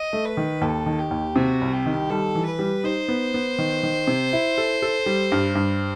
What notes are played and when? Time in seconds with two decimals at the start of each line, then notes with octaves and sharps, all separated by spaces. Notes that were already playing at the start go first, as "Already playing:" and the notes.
Already playing: D#5
0.13 A3
0.25 B4
0.37 D#3
0.61 D#2 A4
0.86 D#3
0.99 G4
1.11 D#2
1.36 C3 F#4
1.61 C2
1.73 G4
1.86 D#3
2.10 G3 A4
2.35 E3
2.47 B4
2.59 G3
2.84 D#4 C5
3.08 B3
3.34 B3
3.58 D#3
3.83 D#3
4.07 C3
4.33 E4
4.58 A4
4.82 A4
5.06 G3
5.32 G2
5.55 G2